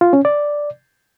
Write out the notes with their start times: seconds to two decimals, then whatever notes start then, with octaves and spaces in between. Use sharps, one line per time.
0.01 F4
0.13 C#4
0.25 D5